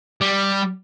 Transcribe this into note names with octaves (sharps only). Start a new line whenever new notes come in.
G3